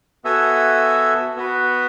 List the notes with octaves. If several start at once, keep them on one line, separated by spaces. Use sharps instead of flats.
B3 F#4 A4 E5 G#5
B3 F#4 B4